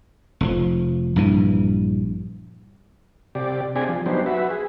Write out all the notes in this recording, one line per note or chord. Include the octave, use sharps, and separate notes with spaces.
F1 G#2 F3
A#1 G2 E3
C3 G4 D5
C4 D4 G4 G#4 D5 G#5
F3
F#3 B3 D4 D#4 G4 C5
F#4 B4 E5
G#4